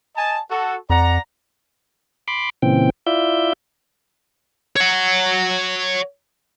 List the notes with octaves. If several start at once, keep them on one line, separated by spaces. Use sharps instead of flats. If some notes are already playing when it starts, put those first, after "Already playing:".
D#5 G#5 A5
F#4 A4
F2 D5 F#5 A#5
B5 C6 D6
A#2 C#3 E3 C4 G5
E4 F4 D5 E5 G6
C#5 F#5